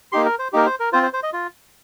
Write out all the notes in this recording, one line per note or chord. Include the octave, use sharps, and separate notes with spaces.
A#3 D#4 G4 C6
A#4
C5
A#3 D#4 G4 A#4
C5
A#4
C4 F4 C5
C5
C5
D#5
F4